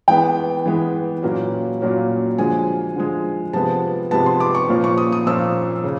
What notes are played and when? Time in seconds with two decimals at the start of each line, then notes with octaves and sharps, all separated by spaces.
0.08 E3 G#3 B3 G5
0.66 E3 G#3 B3
1.23 A#2 F#3 A#3 C#4
1.81 A#2 F#3 A#3 C#4
2.38 D3 F3 G#3 G#5
2.96 D3 F3 G#3
3.53 C3 F3 G#3 B3 A5
4.11 C3 F3 G#3 B3 A5
4.26 C6
4.40 D6
4.55 C#6
4.69 A#2 F3 A#3 C#4
4.84 C#6
4.98 D#6
5.12 D#6
5.26 A#2 F3 A#3 C#4 E6
5.84 C#3